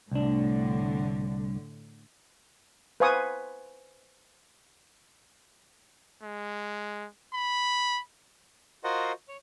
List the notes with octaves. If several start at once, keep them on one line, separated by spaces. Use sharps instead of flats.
C2 A2 D3 D4
B4 C5 F5 G#5 C#6 D#6
G#3
B5
F4 F#4 A#4 C5 D#5 F#5
C#5